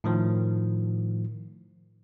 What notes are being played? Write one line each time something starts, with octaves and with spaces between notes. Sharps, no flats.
A2 D#3 F3